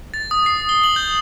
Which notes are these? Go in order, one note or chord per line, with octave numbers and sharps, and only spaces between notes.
A6
D#6
C7
G7
F#7
G6